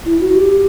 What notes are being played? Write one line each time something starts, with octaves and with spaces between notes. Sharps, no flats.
E4
F#4
G4